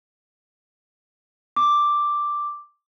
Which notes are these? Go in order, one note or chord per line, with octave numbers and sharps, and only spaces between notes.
D6